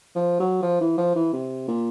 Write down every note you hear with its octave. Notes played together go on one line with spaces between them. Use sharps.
F3
F#3
F3
E3
F3
E3
C3
A#2